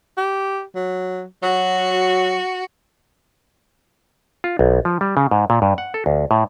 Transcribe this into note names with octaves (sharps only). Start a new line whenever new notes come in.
G4
F#3
F#3 F#4
F4
B1
F3
G3
C#3
G#2
A#2
G2
F#5
A4
D2
A2